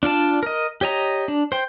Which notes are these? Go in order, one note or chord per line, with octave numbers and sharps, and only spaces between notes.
D4 F4 D5 A5
A#4 D#5
G4 C#5 D#5 A#5
D4
C5 G5